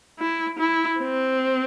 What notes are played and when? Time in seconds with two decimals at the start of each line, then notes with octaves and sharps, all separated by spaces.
0.20 E4
0.59 E4
1.00 C4